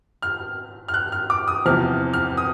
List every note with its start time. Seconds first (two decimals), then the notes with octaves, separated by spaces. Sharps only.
0.22 F6
0.88 F6
0.94 F#6
1.12 F6
1.30 D6
1.48 D#6
1.65 E2 C3 F3 F6
2.14 F6
2.37 D#6